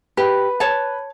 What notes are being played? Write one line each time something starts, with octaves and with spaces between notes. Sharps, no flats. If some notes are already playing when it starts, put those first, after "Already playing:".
G4 B4
C#5 A5